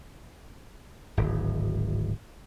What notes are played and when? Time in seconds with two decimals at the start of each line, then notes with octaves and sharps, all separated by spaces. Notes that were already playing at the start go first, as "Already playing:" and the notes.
1.17 D1 G#1